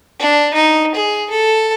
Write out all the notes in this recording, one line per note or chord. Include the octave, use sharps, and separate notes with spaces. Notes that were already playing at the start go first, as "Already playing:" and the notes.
D4
D#4
G#4
A4